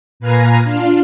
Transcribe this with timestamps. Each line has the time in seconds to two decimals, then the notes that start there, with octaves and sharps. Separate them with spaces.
0.20 A#2 B4 F5 G#5 A#5
0.64 D4 F4 F5